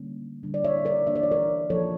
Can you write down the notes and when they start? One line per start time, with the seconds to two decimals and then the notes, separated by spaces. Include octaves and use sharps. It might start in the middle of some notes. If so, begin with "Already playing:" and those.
Already playing: D3 G3 A#3 C#4
0.43 D3 G3 D4
0.54 D5
0.64 C#5 E5
0.85 A#4 D5
1.06 E3 A#3 D4 E5
1.15 D5
1.23 C#5
1.32 A#4 D5
1.70 F3 A#3 C#4 A4 C#5